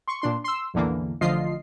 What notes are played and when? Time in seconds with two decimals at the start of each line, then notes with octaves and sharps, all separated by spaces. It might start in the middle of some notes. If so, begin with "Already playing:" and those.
0.08 C6 C#6
0.21 A#2 D4 C6
0.44 C6 E6
0.74 A#1 E2 D3 E3 A#3
1.21 A1 D3 F3 F4 D#5 C7